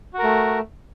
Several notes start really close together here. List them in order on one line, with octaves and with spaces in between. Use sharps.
F#4 A#4 A3